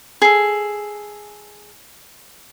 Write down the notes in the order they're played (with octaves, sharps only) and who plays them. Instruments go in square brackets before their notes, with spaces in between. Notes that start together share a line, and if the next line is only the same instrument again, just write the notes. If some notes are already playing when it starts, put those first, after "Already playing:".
[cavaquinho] G#4 A4